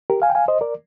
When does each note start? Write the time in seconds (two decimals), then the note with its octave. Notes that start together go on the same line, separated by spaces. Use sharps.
0.10 G4 A#4
0.22 F5 G#5
0.30 G5
0.35 F5 G#5
0.48 C5 D#5
0.61 A#4 D5